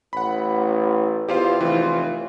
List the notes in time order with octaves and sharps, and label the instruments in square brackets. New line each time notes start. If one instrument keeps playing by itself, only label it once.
[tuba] A1 [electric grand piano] F#5 B5
[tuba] E2 [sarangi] F4 [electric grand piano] G4 C5 F5
[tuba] F1 [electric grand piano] E3